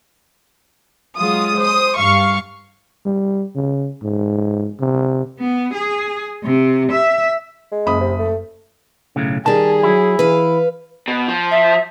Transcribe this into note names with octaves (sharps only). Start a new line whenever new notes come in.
F#3 G#3 F4 D#6
C5 D#6
G2 F5 C#6
G3
C#3
G#2
C3
B3
G#4
C3
E5
G#3
F#1 B5 D#6
C3
A3
B1 A2 C#3
D#3 G3 G#4 A5
F#3 E4
E3 B4 F5
B2
F3
E5